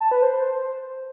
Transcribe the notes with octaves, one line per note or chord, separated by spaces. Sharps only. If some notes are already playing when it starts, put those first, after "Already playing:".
A5
B4
C5